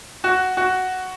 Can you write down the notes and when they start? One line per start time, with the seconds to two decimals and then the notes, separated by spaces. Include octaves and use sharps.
0.24 F#4
0.57 F#4